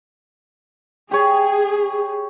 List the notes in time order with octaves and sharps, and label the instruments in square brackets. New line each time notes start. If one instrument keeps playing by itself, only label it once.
[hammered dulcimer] G4 C#5 [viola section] G#4